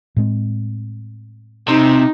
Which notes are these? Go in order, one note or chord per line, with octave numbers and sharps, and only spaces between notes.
A2 G#3 C4
C3 D#4